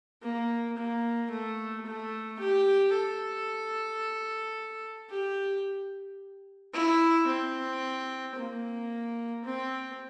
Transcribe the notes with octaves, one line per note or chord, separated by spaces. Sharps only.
A#3
A#3
A3
A3
G4
A4
G4
E4
C4
A#3
C4